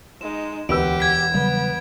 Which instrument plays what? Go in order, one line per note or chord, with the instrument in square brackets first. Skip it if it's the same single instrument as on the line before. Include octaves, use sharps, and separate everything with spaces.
[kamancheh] G#3 D#4 [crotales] E7
[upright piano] E1 B4 E6 [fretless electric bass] D2 [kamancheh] G4 F#5 [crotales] D7
[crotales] G#6 B6
[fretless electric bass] C#3 F#3 G3 [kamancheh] B3